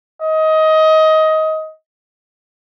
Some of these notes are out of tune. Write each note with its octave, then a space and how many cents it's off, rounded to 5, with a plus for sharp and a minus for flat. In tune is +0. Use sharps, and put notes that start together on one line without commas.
D#5 +20